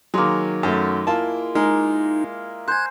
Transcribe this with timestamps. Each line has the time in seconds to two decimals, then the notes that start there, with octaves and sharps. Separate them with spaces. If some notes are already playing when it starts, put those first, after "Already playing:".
0.14 D#3 F#3 G#3 A#3
0.63 F#2 A3
1.07 A#3 E4 F4 A5
1.55 G#3 D#4 A#4
2.68 C5 G#5 F#6 G#6